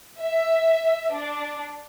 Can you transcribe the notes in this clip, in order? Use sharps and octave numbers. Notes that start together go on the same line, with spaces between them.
E5
D4